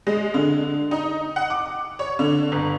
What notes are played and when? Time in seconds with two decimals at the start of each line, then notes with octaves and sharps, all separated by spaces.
0.07 G#3
0.34 D3
0.91 D#4
1.36 F#5
1.50 D6
1.99 C#5
2.19 D3
2.52 G1